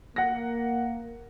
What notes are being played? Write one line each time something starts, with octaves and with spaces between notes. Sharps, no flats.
A#3 F#5 A#6